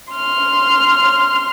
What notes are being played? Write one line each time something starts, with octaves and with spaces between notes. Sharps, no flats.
C6 F6